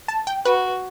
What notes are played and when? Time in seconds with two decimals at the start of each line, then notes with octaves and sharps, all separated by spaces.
0.08 A5
0.27 G5
0.45 F#4 B4